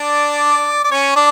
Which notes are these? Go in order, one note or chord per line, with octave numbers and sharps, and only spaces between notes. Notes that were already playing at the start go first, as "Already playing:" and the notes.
Already playing: D4 D5
D5
C#4 C#5
D4 D5